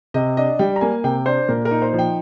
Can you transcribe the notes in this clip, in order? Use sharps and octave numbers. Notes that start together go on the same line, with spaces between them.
C3 D#5
D4 D#5
G3 G5
A#5
A#3 G#5
C3 G5
D4 C5
A#2 A#4
A#4
D#4
C5
F3
G5